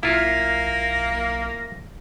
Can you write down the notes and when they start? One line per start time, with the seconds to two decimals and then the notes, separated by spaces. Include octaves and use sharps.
0.03 B1 A#3 E4 F4 A#6